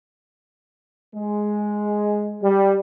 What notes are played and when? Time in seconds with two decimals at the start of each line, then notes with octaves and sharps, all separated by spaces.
1.15 G#3
2.43 G3